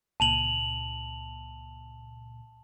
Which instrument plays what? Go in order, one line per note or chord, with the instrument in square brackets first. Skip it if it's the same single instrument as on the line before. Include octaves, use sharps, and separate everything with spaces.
[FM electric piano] C#2 A#2 [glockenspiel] A5 F7 F#7